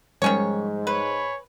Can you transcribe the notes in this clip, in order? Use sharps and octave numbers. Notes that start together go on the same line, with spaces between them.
G#2 D#3 F3 G3 G#3 C#4 C#5
B4 C#5 G#5 B5